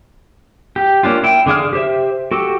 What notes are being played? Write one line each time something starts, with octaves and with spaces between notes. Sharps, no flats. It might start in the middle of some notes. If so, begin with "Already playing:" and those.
G4
A#3 C#4 D4 F4
E4 G5
D3 D4 G#4 F5 F6
G4 C5 E5
F#4 G4 A4